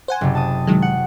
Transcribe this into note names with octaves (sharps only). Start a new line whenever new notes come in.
C5 F#5 G#5
F#1 C3
A5 D#6
D#3 F#3 G#3
F#5